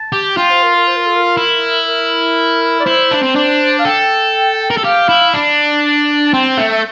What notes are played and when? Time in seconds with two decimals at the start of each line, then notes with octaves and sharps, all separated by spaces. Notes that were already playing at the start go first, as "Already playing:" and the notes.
Already playing: A5
0.12 G4
0.37 F4 G5
0.50 C5
0.63 A#4
0.75 A#4
0.87 C5
0.96 A#4
1.06 A4
1.15 A#4
1.37 E4
1.87 A#4
2.80 D5
2.85 E4 C5
3.11 D4
3.23 C4
3.36 D4
3.79 F5
3.85 A4 G5
4.70 A#4
4.77 A4
4.84 G4 F5
5.09 E4
5.34 D4
6.26 A5
6.33 C4 G5
6.57 A3 E5